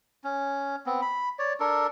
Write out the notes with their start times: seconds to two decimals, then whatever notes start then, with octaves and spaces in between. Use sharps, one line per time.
0.24 C#4
0.86 B3 C4
1.02 B5
1.39 C#5 D5
1.60 D4 A4 A#4